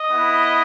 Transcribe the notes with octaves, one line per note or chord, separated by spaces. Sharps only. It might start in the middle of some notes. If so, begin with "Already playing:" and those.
Already playing: D#5
B3 E4